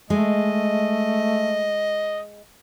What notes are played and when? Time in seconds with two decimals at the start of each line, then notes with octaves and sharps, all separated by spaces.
0.10 G#3 A3 D#5